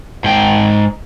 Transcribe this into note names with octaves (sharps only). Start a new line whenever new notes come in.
G#2 G5